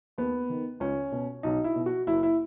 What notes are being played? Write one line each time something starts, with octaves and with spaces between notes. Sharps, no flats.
D#2 B3
D#3
C#2 C#4
B2
B1 D#4
E4
B2
F#4
F#1 E4
E4